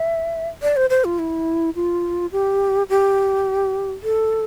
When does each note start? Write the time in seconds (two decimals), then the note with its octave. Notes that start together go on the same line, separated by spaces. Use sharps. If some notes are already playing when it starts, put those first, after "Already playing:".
Already playing: E5
0.62 D5
0.76 C5
0.90 C5
1.05 F4
1.19 E4
1.75 F4
2.32 G4
2.89 G4
4.03 A4